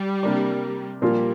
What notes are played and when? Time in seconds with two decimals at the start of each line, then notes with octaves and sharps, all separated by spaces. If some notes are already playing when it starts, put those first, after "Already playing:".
Already playing: G3
0.23 C3 A#3 D4 A#4 D5
1.02 A#2 F3 G3 A#3 F4